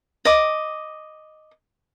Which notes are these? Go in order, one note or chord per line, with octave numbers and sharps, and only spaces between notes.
D#5 D6